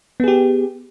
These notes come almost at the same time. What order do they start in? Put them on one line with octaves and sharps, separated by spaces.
B3 G#4 G4